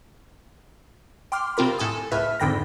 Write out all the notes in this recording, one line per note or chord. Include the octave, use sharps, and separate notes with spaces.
G5 C6 D6 F6
C3 C4 F4 A#4 B5
A2 A4 G#5 D#6
C#2 A2 B4 E5 F6 B6
F2 G#2 D3 G5 B5 A#6